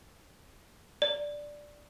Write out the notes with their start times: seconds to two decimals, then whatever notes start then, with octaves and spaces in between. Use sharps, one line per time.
1.02 D5